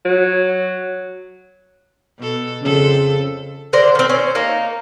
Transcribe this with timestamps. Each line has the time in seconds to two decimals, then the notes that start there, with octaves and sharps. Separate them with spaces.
0.05 F#3
2.19 B2 A4
2.62 F2 C#3 A4
3.73 D3 A#4 C5 D5
3.95 D#3 C4
4.09 C#4 C5
4.35 A#3 D#4 A#4